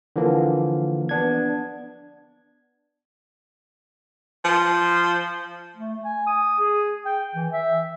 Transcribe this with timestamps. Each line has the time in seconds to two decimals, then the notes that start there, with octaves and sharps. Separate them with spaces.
0.16 D3 E3 F3 A#3
1.09 B3 D4 G#6
4.45 F3
5.76 A3
6.04 G#5
6.27 D#6
6.59 G#4
7.05 G5
7.35 E3
7.52 E5